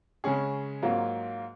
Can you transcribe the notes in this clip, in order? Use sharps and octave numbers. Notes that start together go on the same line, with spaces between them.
C#3 G#3 C#4 G#4
G#2 F#3 A#3 F4